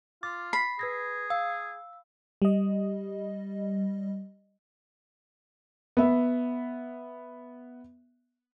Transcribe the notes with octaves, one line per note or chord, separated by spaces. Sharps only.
F4 D6 A6
B5 C7
G#4 B4 G#6 A#6
F5 E6
G3 D#5
B3 E5